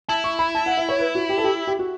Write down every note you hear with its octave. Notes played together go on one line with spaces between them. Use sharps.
E4 A5
C#6
B5
A5
F#5
E5
C#5
B4
F#4
G4
A4
G4
G4
F#4